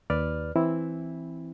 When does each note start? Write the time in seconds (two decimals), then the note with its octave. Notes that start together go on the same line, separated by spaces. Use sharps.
0.10 D#2 B4 D5 F6
0.56 E3 C4 E4